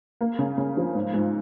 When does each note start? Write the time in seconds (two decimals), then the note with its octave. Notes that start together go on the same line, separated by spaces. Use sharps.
0.21 A#3
0.39 C#3
0.58 C#3
0.77 F3
0.95 G#2
1.14 G#2